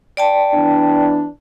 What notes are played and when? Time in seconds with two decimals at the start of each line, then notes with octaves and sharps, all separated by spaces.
0.17 D5 G5 A5
0.54 E3 B3 D4